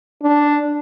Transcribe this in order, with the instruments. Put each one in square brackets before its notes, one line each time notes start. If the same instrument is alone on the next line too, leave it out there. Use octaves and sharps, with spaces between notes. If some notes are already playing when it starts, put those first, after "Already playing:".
[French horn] D4